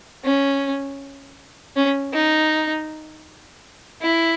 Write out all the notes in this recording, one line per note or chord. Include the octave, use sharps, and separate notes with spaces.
C#4
C#4
D#4
E4